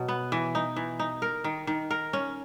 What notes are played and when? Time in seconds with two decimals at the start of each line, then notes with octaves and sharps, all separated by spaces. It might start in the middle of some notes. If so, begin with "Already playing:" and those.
Already playing: B2 F#3
0.08 B3
0.32 E3
0.55 D#4
0.76 E3
0.99 D#4
1.22 A#4
1.44 D#3
1.67 D#3
1.91 A#4
2.13 C#4